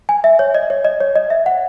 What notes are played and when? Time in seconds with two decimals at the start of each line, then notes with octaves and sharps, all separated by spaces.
0.09 G#5
0.24 E5
0.39 C#5
0.54 D#5
0.70 C#5
0.85 D#5
1.01 C#5
1.16 D#5
1.30 E5
1.46 F#5